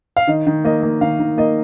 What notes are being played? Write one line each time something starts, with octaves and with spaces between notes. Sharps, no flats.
F5
D#3 D#5
D#3
A#3 D#5
A#3
D#3 F5
D#3
A#3 D#5